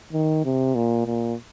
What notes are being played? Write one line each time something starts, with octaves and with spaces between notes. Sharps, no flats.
D#3
C3
A#2
A#2